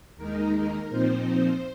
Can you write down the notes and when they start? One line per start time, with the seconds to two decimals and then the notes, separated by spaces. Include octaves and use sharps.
0.16 D#2 D#3 G#3 D#4 A#4
0.54 A#4
0.90 A#2 F3 C4 D#4 C5